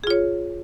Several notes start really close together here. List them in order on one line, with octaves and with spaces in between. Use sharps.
G#4 F4 C#5